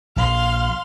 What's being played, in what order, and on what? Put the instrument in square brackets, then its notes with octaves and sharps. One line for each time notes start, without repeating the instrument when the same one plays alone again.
[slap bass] A#1 [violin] F5 C6